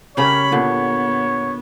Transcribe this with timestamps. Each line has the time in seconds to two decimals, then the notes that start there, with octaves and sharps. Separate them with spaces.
0.17 C#3 C#4 G4 A#4 C#5 B5
0.52 A#2 D3 B3